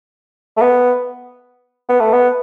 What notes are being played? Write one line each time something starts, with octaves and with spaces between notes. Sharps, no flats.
A3
B3
B3
A3
B3